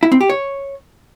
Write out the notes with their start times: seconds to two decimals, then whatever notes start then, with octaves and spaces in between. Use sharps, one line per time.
0.03 E4
0.12 C4
0.21 G4
0.30 C#5